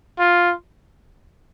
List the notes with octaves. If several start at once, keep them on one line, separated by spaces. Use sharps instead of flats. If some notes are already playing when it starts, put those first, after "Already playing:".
F4